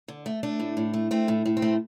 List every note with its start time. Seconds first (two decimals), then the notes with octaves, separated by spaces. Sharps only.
0.08 D3
0.26 A3
0.43 A3 D4
0.60 A2
0.77 A2
0.94 A3
1.11 A3 C4
1.28 A2
1.45 A2
1.57 C4
1.62 A3